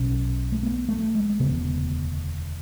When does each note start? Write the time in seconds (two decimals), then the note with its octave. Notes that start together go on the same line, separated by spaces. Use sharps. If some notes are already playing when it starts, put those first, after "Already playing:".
Already playing: B1 B2 C#4
0.52 A3
0.63 B3
0.89 A3
1.15 G#3
1.40 E1 D2 C#3 B3